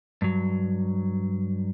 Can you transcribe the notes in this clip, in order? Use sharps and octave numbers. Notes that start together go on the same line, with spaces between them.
G2 F#3